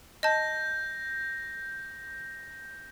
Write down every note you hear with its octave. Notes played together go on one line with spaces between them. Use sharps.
D#5 A5 G6 A#6